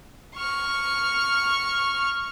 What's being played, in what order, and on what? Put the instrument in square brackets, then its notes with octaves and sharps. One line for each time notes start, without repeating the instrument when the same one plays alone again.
[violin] C#6 F6